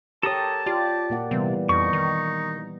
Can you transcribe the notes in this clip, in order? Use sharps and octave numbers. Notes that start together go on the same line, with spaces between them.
G4 A4 A#4 C#5 A5 D#6
F4 G4 D5
A#2 A#3 F#5
C3 E3 G3 B3
F2 D#4 C#6
D#3